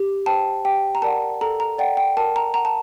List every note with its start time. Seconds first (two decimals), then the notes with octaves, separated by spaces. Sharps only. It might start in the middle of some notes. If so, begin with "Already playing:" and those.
Already playing: G4
0.26 C5 G5 A5
0.65 G4 G5
0.95 A#5
1.02 A#4 D5 F#5 A5
1.41 A4 A#5
1.60 A#5
1.78 D5 F#5 G5
1.97 G5
2.17 A#4 A5
2.36 A#5
2.54 F#5 A#5
2.65 A5